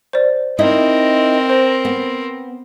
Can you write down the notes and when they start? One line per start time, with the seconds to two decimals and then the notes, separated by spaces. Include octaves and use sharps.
0.13 C5 D5
0.59 C4 D#4 E4 A#4 D#5
1.49 C5
1.85 B3